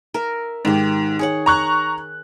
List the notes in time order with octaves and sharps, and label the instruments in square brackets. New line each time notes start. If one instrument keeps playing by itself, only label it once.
[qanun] A#4 E5
[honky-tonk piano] G#2 [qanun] D#3 G4
[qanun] G#4 C#5 F#5
[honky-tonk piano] A#5 C#6 F#6